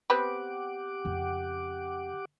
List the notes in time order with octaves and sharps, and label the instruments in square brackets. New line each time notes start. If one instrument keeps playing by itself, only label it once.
[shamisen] B3 C4 B4 [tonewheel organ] G4 F#5 D6
[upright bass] F2 C#3